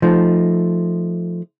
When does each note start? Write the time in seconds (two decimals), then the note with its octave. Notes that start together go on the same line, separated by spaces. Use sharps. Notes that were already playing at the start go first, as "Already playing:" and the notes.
0.02 F3 A3 D#4